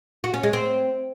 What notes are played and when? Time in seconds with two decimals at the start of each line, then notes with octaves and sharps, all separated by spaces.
0.24 F#4
0.34 C#4
0.43 G#3
0.53 C4